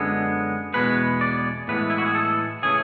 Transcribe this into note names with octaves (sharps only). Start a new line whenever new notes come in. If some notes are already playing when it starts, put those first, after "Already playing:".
Already playing: F#2 D3 G#3 B3
E2 B2 G#3 B3 B4
D5
A2 E3 G#3 B3 B4
E4
F#4
G#4
A4
C#3 E3 A3 G#4